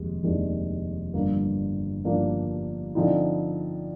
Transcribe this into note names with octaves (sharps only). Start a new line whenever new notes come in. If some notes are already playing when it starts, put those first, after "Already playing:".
Already playing: F1 D#2 D#3 G#3
F1 D#2 D#3 G#3 D4
G1 G2 F3 A#3 D4
G1 G2 F3 A#3 D4
D3 F3 C4 D#4